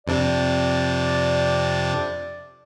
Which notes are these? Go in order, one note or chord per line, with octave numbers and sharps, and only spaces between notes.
F2 C3 D4 D5